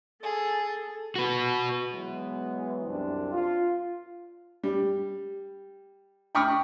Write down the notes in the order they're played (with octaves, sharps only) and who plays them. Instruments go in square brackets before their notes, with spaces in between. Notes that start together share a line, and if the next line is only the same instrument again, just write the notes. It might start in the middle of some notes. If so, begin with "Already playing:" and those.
[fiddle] G#4 [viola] A4
[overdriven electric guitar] F#4 B4
[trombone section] E3 F#3 G#3 B3
C2 F#2 C4 D4
F4
[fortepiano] G3
G5 B5 C#6 D#6 F6